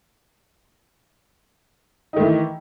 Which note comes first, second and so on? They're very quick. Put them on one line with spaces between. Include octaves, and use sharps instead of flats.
D#4 D#3 A3 E3